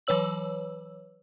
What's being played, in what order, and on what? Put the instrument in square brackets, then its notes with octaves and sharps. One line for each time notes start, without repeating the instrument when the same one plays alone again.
[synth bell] E3 F#3 B4 C#5 E6 F#7